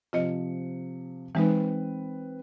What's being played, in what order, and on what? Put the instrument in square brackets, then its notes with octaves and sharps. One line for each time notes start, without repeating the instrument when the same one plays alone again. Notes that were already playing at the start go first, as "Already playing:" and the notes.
[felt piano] C3 F3 C#7 [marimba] F4 D#5
[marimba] E3 G#3 D#4 [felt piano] C4 B4